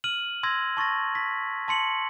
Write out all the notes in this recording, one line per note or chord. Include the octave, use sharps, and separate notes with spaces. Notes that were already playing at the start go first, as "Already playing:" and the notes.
F6 D#7 F#7
C6 E6 G#6 A#6
A5 C#6 A6 A#6
B6
A5 C6 C#7 F#7